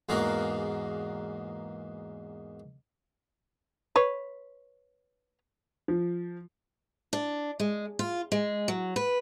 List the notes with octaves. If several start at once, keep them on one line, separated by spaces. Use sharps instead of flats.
E2 G#2 A#3 F#4 A#4
B4 C#5
F3
D4
G#3
F4
G#3
F#3
B4